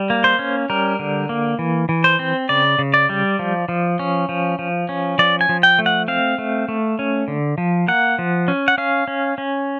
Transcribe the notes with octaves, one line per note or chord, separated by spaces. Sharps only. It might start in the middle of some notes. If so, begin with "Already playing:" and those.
Already playing: G3
A#3
C5
C#4
G3 A#4
D3
A#3
E3
E3
C5
C4
C#3 D5
C#3
D5
G3
F3
F3
C#4
F3
F3
C#4
F3 D5
G#5
F3
G5
A3
F#5
C4 F5
A3
A3
C#4
D3
F3
A#3 F#5
F3
C#4
F#5
C#4 F5
C#4
C#4